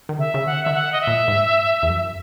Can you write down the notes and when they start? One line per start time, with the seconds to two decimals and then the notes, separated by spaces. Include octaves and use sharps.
0.09 D#3
0.18 C#3 E5
0.34 C#3
0.46 D#3 F#5
0.63 D#3 E5
0.74 F#5
0.92 D#5
1.01 E5
1.07 A#2
1.28 G#2
1.83 E2
1.90 F#2